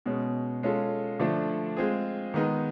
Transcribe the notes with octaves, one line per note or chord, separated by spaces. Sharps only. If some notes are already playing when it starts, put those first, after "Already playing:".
B2 G#3 C#4
G#3 C#4 F4 A4
D3 F3 A3 D4
G#3 C4 F4 G#4
D#3 G#3 B3 D#4